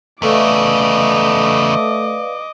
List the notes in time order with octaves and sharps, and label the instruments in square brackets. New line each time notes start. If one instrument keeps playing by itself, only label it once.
[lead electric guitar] E2 C#3 [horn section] A3 [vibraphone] B4 D5 F5 [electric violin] D#5 D6